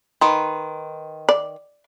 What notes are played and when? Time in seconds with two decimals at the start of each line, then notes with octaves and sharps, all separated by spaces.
0.21 D#3 B4 C6
1.29 D5